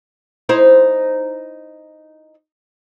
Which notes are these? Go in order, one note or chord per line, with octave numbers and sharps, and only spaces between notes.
D#4 E4 C5